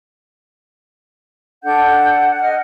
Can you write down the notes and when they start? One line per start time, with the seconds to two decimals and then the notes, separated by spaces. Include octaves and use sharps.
1.63 D4 A4 F#5 G6
2.41 D#5 F6